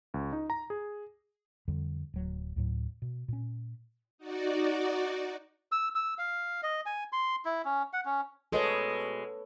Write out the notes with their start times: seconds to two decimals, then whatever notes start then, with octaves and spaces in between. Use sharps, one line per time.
0.14 C#2
0.33 D#4
0.50 A#5
0.70 G#4
1.68 F2 D3 G3
2.14 D1 F#3
2.56 D2 A2 F#3
3.02 B2
3.28 A#2 C#4
4.18 D#4 F#4 D5
5.72 E6
5.95 E6
6.18 F5
6.63 D#5
6.86 G#5
7.12 C6
7.45 E4
7.65 C#4
7.93 F#5
8.05 C#4
8.52 B2 G#3 A4 B4 C#5